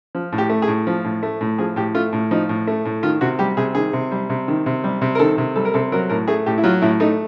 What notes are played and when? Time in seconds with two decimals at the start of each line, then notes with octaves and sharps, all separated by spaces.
0.15 F3
0.32 A2
0.38 G4
0.50 A3
0.62 G#4
0.68 A2
0.87 F3
1.04 A2
1.23 A3
1.41 A2
1.58 F3 G#4
1.76 A2 G4
1.95 A3 F4
2.13 A2
2.31 F3 D#4
2.49 A2
2.67 A3
2.85 A2
3.03 D#3 F4
3.21 C3 F#4
3.39 G3 G4
3.57 C3 G#4
3.75 D#3 G#4
3.93 C3
4.11 G3
4.30 C3
4.48 D#3
4.66 C3
4.84 G3
5.02 C3
5.15 A#4
5.19 D#3 A4
5.38 C3
5.56 G3 A4
5.65 A#4
5.74 C3 A4
5.92 F#3 A#4
6.09 A2 A#4
6.27 A3 G#4
6.46 A2 G4
6.58 E4
6.64 F#3 F4
6.82 A2 E4
7.00 A3 D#4